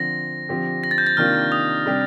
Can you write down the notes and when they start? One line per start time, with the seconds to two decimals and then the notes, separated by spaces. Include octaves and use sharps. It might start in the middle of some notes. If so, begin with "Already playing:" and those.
Already playing: D3 F3 C4 A#6
0.49 D3 F3 C4 G4
0.84 A#6
0.91 A6
0.98 G6
1.07 A6
1.17 C3 D#3 A#3 D4 F4 F6
1.52 D#6
1.86 C3 G3 D4 G4